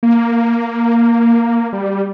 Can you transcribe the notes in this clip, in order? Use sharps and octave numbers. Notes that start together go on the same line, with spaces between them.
A#3
G3